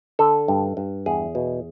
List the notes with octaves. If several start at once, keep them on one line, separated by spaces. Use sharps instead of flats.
D3 A4
G2
G2
E2 G#4
B2